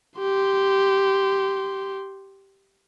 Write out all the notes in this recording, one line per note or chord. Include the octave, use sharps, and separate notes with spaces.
G4 C6